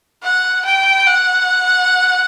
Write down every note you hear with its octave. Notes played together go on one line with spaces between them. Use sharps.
F#5
G5
F#5